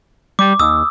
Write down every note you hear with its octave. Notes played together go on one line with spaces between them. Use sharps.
G3 D6
D#2 D#6 E6